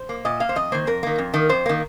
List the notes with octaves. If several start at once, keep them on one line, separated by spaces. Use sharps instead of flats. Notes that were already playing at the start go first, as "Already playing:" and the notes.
Already playing: C5
A#3
A#2 D#5
A#3 F5
C5
F2 D#5
D#3 A#3 C5
F2 A#4
D#3 A#3
F2
D#3 A#3
F2 C5
D#3 A#3